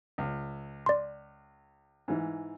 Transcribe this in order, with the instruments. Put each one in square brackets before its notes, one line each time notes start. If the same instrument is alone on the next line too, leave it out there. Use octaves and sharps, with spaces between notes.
[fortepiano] C#2
[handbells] D5 C6
[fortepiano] G#2 E3